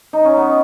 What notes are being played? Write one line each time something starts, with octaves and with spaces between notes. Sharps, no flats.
D#4
C#4
B3